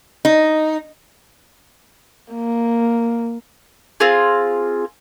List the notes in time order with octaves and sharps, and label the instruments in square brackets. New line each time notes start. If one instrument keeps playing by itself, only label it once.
[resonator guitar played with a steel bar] D#4
[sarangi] A#3
[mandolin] C4 F4 G#4